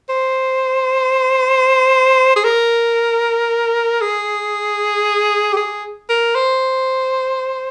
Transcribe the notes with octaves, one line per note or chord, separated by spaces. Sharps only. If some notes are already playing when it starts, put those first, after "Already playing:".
C5
G#4
A#4
G#4
G4
G#4
A#4
C5